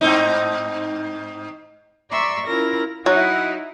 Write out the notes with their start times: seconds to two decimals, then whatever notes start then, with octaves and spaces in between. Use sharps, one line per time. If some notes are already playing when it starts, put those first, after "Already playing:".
0.01 G#2 C4 D#4
2.10 D5 E5 A#5 C6 C#6 E6
2.46 C#4 E4 F4 A#4 A#6
3.06 F#3 D#4 E4 F#5